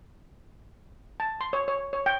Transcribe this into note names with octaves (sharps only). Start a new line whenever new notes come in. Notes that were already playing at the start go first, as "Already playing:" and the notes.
A5
C6
C#5
C#5
C#5
G5